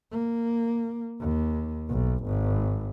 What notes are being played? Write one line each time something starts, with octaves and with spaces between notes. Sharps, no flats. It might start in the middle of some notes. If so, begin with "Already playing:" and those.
A#3
D#2
B1
G#1